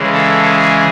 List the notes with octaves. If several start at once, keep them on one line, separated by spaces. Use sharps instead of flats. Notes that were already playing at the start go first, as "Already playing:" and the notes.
Already playing: C#3 E3 G#3
A4
G#4